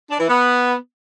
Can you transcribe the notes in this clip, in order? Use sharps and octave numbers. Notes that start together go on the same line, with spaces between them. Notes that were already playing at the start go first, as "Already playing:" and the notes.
D4
E3
B3